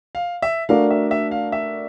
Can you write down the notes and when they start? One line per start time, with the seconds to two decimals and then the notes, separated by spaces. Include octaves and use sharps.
0.15 F5
0.42 E5
0.69 A3 D4 F#4 A#4 D5 F5
0.91 E5
1.11 E5
1.31 F5
1.52 E5